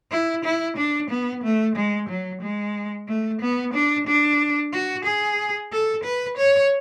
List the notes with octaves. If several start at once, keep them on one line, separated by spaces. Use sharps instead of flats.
E4
E4
D4
B3
A3
G#3
F#3
G#3
A3
B3
D4
D4
F#4
G#4
A4
B4
C#5